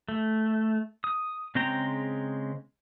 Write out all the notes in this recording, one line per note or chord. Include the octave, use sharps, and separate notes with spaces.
A3
D#6
C#3 G#3 C4 G5 A#5